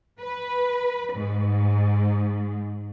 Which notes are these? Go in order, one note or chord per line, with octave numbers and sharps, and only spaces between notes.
B4
G#2